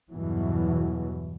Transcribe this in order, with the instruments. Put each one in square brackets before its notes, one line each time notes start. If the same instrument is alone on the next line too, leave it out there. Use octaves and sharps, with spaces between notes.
[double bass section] E2 G2 B2 E3 F#3